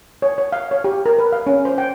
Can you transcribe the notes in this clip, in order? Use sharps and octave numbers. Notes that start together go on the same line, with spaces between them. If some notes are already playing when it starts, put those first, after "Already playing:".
C#5
C#5
F5
C#5
G4
A#4
B4
F5
C#4
C5
G5